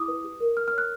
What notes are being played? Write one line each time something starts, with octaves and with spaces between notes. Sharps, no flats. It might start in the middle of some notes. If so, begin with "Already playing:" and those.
Already playing: E4 G#4 D6 D#6
B4
G4
A#4
G4 F6
F6
C#5
F#6